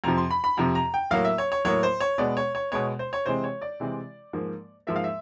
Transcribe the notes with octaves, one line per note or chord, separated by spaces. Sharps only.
F2 C3 F3 A#5
C6
B5
B5
F2 C3 F3 A#5
A#5
G5
A2 F#3 A#3 F5
E5
C#5
C#5
A2 F#3 A#3 C#5
C5
C#5
B2 G#3 B3 D5
C#5
C#5
B2 G#3 B3 C#5
C5
C#5
C3 E3 G#3 C4 C5
C#5
D5
C3 E3 G#3 C4
G#2 F3 A#3
G#2 F3 A#3 E5
F5
E5